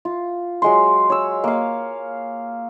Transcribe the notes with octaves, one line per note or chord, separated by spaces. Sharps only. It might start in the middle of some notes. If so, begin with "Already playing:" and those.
F4
F#3 G#3 C6
C#5 E6
A#3 F5